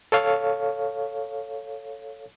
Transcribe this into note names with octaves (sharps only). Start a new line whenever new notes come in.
A4 C#5 F5